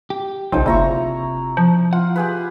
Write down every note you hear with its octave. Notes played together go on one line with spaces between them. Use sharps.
G4
B1 C#3 F3 G3 D#4 C5
F#1 C3 E4 A#5 C#6
F3
F4 F#5
G4 G#4 B4